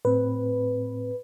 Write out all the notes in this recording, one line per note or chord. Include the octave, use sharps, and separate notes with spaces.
A2 C4 B4